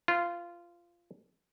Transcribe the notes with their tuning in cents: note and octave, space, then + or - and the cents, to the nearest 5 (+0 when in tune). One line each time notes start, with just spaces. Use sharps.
F4 -15 B4 +45